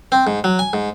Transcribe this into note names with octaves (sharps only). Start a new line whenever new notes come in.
C4
G#2
F#3
G#5
G#2